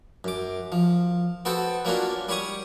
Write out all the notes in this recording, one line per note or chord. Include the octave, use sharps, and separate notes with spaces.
F#2 D6
F3
B3 F#4 A4 C5 G5
F#3 A#3 C#4 D4 F4 F#4
G3 G4 C#5 C#6 D#6